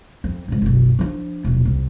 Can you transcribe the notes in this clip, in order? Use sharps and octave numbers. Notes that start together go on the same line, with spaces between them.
F2
G#2 C#3
F#1 B1
F3 D4
D#1 B1
C2